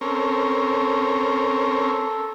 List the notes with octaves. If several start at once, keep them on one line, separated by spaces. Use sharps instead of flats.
C4 C#4 A4 A#4